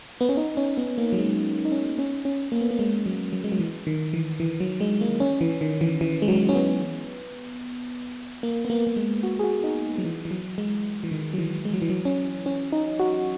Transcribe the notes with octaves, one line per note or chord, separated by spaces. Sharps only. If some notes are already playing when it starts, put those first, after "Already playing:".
B3
C#4
D#4
C#4
B3
A#3
F#3
G#3
D#4
C#4
C#4
C#4
A#3
B3
A#3
G#3
F#3
F#3
G#3
F#3
E3
D#3
E3
E3
F#3
G#3
A#3
C#4
E3
D#3
E3
E3
G#3
F#3
C#4
B3
A#3
B3
A#3
A#3
G#3
F#4
G#4
F#4
D#4
F#3
E3
E3
F#3
G#3
E3
D#3
F#3
E3
G#3
F#3
E3
F#3
C#4
C#4
D#4
F#4